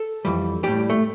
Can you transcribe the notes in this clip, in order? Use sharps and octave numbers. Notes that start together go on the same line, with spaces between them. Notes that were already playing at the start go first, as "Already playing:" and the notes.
Already playing: A4
F2 E3 G3
A2 G3 G4
A3